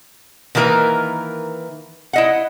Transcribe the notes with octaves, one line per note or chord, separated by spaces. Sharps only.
D#3 E3 A#3 A#4 B4
E4 D#5 F#5